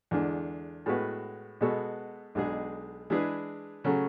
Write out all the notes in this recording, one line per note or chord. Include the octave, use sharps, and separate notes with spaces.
E2 D3 G#3 D4
A2 G#3 B3 F#4 B4
B2 G#3 B3 F#4 A4
B1 B2 G#3 D4 G#4
E3 G#3 D4 G#4 B4
C#3 F#3 A3